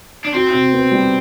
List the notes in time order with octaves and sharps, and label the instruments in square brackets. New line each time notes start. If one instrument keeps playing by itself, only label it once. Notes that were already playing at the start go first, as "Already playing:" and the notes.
[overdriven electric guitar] D4
[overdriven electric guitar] C4 [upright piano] F#4
[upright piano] C3
B3
G3